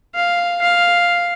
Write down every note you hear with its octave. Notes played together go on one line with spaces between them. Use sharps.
F5
F5